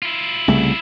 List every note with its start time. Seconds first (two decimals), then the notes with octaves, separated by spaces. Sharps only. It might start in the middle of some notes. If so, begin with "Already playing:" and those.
0.02 E4 F4
0.48 C2 C#3 A3